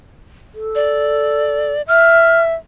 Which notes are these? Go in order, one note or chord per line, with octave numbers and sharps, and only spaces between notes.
A4
D5
E5 F6